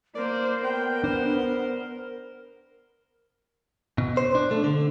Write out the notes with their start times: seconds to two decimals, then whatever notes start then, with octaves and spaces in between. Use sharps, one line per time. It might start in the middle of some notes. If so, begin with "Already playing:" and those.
0.15 A#3 A#4 C5 D5
0.64 B3 G5
1.04 D4 C5
3.98 B2
4.17 C5
4.35 D4
4.51 A3
4.64 D3